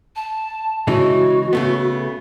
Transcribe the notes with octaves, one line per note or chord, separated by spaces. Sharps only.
A5
C#3 E3 G#3 F#4
C#3 A3 B3